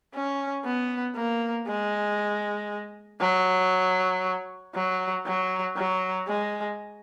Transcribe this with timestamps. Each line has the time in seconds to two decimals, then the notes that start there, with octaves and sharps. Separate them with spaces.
0.14 C#4
0.65 B3
1.16 A#3
1.67 G#3
3.21 F#3
4.75 F#3
5.26 F#3
5.77 F#3
6.28 G#3